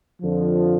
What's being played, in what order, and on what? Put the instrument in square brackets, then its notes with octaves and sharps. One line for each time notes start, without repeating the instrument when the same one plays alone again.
[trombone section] F2 D3 F3